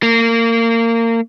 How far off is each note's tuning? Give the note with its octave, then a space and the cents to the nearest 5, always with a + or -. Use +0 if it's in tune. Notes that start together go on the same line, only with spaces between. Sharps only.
A#3 -25